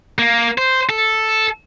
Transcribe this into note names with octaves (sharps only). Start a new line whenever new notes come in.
A#3
C5
A4